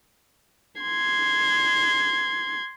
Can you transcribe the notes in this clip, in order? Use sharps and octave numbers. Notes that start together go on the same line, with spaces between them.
C6 G#6